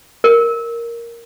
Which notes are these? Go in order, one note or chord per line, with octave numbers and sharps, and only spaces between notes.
A#4